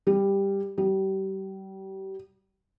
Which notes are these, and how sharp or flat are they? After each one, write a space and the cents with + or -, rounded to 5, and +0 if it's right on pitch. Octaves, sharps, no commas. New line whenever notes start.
G3 +10
G3 -30